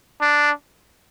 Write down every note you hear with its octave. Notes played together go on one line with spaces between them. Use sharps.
D4